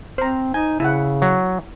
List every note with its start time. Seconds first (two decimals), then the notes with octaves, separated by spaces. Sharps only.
0.18 C4 C5 A#5
0.54 D#4 G#5
0.80 C#3 E4 E5 F#5
1.22 F#3